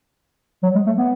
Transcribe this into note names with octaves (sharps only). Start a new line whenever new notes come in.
F#3
G#3
A3
B3